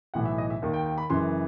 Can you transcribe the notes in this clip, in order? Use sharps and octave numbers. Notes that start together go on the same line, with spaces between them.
B1 A2 E3 F#5
E5
D#5
E5
D#2 D#3
G5
G5
B5
F#1 F#2 E3 C6